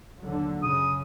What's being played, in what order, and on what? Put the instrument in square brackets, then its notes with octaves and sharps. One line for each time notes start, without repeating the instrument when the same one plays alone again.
[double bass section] D#2 D3 F#3
[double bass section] F#2 C#3 [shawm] D#6